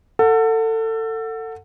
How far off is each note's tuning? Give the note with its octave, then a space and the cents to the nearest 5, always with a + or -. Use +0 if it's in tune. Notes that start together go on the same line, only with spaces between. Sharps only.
A4 +25 F#5 -15